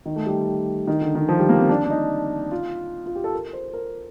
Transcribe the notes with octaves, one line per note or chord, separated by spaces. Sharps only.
D#3
A3
G3
D#3
D3
D#3
F3
G3
A#3
C4
D4
D4
D#4
F4
F4
G4
A4
A#4
C5
A#4